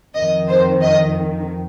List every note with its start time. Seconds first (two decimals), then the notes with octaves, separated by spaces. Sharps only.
0.15 F2 D#3 D#5
0.48 C5
0.82 D#5